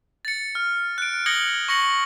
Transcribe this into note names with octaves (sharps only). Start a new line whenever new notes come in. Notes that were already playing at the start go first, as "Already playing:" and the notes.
A6 C#7
F6
F#6 D7
D#6 G#6 A#6 C#7 F#7 G7
C#6 A#6 C#7 F#7